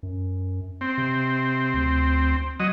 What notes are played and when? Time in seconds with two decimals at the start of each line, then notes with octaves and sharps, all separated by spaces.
0.03 F#2
0.81 C4
0.98 C3
1.74 D2
2.60 F#3 D#5